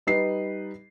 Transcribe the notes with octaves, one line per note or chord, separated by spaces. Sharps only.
G3 D#4 B4 C7